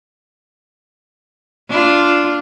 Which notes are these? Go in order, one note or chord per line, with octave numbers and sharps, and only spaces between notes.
D4 F4